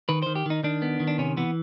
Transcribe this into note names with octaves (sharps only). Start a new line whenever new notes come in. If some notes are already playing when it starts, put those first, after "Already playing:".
D#3 B4
D#3 C5
G4
D#3 D#4
D#3 D4
B3
D#3
D4
C3 C#4
E3 B3